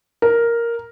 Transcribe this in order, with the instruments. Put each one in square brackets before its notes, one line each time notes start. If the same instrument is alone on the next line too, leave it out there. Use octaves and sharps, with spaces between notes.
[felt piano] A#4